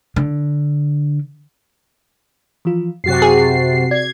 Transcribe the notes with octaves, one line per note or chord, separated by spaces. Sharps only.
D3
E3 F3 F4
F#2 C3 F#3 F#4 A6 C7
G#4
D5 G#6